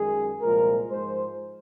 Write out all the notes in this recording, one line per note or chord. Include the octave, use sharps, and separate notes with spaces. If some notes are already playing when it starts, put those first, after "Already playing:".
Already playing: F#2 D#3 G#3 G#4
C2 A#2 F3 G#3 A#4
G#2 F3 G#3 C5